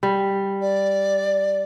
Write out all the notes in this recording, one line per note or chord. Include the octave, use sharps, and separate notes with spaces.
G3
D5